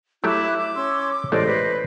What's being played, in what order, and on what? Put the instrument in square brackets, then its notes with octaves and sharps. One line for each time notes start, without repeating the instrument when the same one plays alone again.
[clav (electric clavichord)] F#3 A3 G4 [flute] E4 [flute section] D6 F#6
[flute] D6
[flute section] C#4 C6 E6
[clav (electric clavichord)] A1 G#3 A3 [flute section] C5 D#5 [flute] D5
[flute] B4